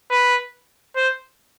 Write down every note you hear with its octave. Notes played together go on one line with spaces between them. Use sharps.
B4
C5